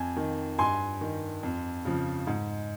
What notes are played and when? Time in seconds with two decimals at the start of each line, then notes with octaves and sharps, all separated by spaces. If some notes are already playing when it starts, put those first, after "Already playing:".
Already playing: F2 G#5
0.16 D#3
0.59 G2 G#5 C6
1.01 D#3
1.43 F2
1.85 C#3 F3
2.27 G#2